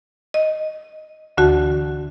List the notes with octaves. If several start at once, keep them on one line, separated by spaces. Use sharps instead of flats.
D#5
D2 D3 E3 F#4 A5